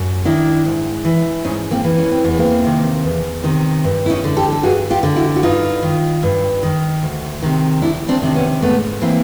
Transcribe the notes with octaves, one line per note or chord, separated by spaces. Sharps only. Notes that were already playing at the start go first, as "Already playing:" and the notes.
Already playing: F#2
D#3 D4 E4
G#2
E3
G#2 C#4 D#4
A#3 C4
E3
C#4
C4
E2 B3
A#3 C4
C3 D#3
E2
C3 D#3
G2
E4
C#4 D#4
D3
G4 A4
A4
G2 F#4 G#4
F4 G4
D3
E4 F#4
F#4
G2 D#4 F4
D#3
G2
D#3
D2
C3 D#3
D2 D4 E4
C4 D4
C3 D#3 D4
B3 C#4
G#2 A3 B3
E3 A#3 C4